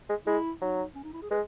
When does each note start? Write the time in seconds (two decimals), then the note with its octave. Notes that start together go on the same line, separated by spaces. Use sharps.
0.10 G#3
0.27 G#3 E4
0.61 F#3 D#4
0.95 C#4
1.04 D#4
1.13 E4
1.22 G#4
1.31 G#3 B4